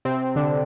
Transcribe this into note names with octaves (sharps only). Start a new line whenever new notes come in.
C3 C4
D3 D4